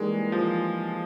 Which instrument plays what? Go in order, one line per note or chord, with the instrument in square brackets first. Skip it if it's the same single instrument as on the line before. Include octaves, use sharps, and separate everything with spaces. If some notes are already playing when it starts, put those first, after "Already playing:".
Already playing: [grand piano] E3 G3 A#3 D#4 G4 [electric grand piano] G#3
[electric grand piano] F3